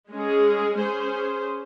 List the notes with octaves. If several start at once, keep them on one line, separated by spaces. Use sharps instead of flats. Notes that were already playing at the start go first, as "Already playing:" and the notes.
G#3 C#4 G#4
C#4 G#4 C5